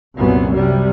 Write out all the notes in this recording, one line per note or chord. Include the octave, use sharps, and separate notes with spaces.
C2 F#2 A#2 B3
C3 G3